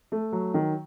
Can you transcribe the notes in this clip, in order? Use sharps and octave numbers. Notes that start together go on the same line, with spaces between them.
A3
F#3
D#3